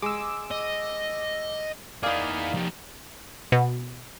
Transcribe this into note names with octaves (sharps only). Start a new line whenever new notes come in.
G#3 D6 E6
D#5
A#3 D#4 E4 G#4 D5 F5
F3 G4
B2